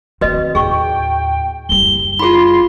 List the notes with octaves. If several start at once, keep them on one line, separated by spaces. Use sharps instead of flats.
D#3 C4 F#4 B4 D#5
D#2 A2 G#4 G5 C#6
F#1 G3 G7
E4 F4 G#4 B5 C6